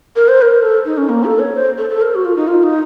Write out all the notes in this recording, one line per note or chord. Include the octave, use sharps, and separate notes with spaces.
A#4
C5
A#4
A4
D#4
C#4
A#3
A4
C#5
C5
A4
A4
A#4
F#4
F4
D#4
F4
D#4